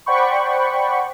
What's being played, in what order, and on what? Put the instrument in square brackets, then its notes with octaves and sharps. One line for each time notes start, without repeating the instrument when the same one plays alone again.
[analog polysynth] C5 D5 F#5 G5 B5 C#6